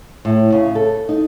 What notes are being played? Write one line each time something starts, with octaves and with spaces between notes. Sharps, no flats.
A2
C#3
A4
D#4